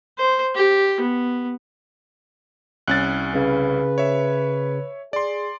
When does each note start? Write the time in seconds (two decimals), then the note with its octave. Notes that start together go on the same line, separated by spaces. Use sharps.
0.18 C5
0.55 G4
1.01 B3
2.88 C2 C#4 F#6 A6
3.35 C#3 B4
3.98 C#5 E5
5.13 G#4 D5 C6